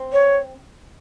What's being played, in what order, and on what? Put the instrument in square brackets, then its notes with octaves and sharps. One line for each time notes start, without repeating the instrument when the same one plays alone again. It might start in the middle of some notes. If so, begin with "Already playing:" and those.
Already playing: [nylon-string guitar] C4
[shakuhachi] C#5